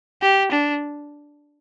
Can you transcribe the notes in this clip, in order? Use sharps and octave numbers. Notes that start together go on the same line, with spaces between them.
G4
D4